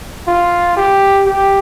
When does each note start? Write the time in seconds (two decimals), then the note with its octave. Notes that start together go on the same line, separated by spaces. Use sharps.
0.28 F4
0.77 G4
1.26 G4